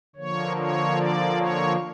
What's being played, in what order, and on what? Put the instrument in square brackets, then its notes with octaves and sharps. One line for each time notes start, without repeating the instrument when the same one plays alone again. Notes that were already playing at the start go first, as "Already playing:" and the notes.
[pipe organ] D3 F3 A#3 C#5
C#5
D5
C#5